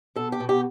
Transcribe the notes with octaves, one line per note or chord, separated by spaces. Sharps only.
B2 A4
G4
B2
G4